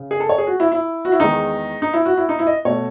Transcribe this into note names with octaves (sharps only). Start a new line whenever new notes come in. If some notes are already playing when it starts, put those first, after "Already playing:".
Already playing: C#3
G#4
A4
C#5
G#4
F#4
E4
E4
F#4
E4
E2 D#3 G#3 D#4
D#4
E4
F#4
E4
D#4
E4
D#5
B2 A3 C#5